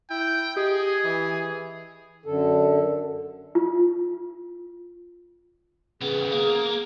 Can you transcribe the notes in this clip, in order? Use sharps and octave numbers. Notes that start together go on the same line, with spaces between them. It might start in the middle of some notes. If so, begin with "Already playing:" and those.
E4 G5
G4 G#4 D#5
E3
F#2 D3 A4
F4
C#3 B3 G#4
A#3